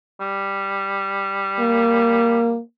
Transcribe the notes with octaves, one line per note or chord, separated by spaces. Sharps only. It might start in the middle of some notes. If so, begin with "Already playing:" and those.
G3
A#3